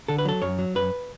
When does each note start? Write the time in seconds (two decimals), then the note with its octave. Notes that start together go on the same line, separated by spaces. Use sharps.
0.08 D3 A4
0.18 B4
0.25 F#3 A4
0.42 F#2 C#5
0.59 F#3
0.75 F#2 B4